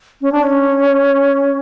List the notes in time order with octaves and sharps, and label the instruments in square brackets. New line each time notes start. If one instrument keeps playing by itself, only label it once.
[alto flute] C#4
D4
C#4